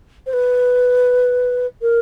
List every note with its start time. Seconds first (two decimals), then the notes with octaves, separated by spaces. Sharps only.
0.26 C5
0.33 B4
1.82 A#4